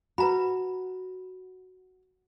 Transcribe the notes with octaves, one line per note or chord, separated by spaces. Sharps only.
F#4 B4 A#5 B5